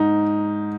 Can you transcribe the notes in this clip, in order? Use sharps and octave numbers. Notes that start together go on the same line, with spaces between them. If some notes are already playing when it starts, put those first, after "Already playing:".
Already playing: G#2 D#4